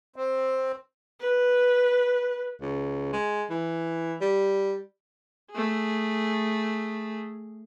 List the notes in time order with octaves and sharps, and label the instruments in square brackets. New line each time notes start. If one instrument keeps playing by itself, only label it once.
[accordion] C4
[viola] B4
[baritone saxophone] C#2
G#3
E3
G3
[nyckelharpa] A3 G#4